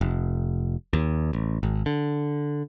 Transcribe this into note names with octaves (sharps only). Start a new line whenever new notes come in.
F1
D#2
A1
G#1
D3